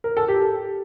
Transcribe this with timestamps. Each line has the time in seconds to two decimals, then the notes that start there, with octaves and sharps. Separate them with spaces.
0.04 A#4
0.17 A4
0.28 G4